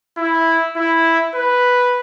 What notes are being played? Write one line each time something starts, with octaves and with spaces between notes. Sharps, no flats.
E4
E4
B4